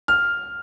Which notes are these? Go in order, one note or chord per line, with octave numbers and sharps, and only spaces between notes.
F6